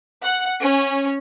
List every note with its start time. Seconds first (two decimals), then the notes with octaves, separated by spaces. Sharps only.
0.22 F#5
0.62 C#4